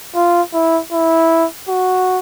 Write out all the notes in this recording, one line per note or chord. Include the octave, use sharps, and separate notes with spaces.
F4
E4
E4
F#4